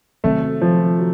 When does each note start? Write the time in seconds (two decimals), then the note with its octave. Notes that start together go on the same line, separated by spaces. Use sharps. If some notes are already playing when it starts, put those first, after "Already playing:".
0.24 C3 D#3 F#3 A3 C4
0.61 F3
0.99 F#3